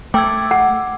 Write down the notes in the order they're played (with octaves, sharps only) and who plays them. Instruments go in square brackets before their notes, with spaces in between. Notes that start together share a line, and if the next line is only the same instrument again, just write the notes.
[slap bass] A3 [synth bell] G5 E6 [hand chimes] D6 G#6
[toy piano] F#5